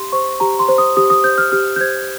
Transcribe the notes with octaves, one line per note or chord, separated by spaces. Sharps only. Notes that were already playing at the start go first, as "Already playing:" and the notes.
Already playing: G4 C6
C5 C#6
G4 A#5
C6
C5
D#6
G4 D#6
D#6
C5 G6
F6
G4 F6
G6
C5 G#6